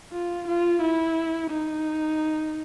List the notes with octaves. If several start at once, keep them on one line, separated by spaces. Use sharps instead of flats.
F4
F4
E4
D#4